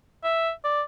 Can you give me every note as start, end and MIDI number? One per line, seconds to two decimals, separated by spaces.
0.24 0.51 76
0.64 0.82 74